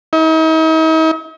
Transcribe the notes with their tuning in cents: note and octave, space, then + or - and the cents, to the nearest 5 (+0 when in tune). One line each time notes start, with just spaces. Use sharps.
D#4 +45